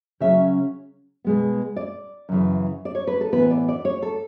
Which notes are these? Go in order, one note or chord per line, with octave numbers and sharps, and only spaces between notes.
C#3 F#3 C#4 E5
B2 G#3 B3
D5
F#2 C#3 E3
D5
C#5
B4
A4
A2 E3 B3 B4
D5
D5
C#5
A4